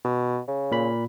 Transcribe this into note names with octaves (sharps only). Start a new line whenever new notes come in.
B2
C#3
A#2 B5